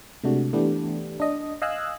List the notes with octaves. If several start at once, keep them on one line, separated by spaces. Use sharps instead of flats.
C3 G#3 A3 D4 F#4
E3 A3 B3 D4 G4
D4 D#5
D#5 F5 G#5 E6 F#6